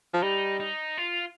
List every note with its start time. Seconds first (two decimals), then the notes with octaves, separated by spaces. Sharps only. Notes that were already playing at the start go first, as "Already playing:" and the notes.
0.14 F3
0.23 G3 D#4
0.60 D#4
0.97 F4